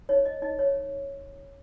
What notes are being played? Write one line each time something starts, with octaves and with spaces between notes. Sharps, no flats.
D#4 C#5
D#5
D#4 D#5
C#5